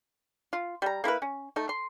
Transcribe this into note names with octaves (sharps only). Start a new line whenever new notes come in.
F4
G3 A#5
A#3 E4 A#4 B4
C#4
A3 D#4
C6